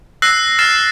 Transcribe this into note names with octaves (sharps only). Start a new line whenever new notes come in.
E6 F#6 A#6 C7
F6 A6 C7 E7